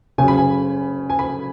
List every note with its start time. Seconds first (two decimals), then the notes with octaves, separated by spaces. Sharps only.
0.18 F#2 C#3 G#5
0.28 B5
0.38 G#5
1.10 G#5
1.19 B5